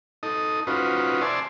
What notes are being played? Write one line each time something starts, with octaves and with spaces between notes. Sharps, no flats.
D#4 A4 D#5
C#4 D#4 F4 F#4 B4 C5
C5 D5 E5 G#5 A5 C6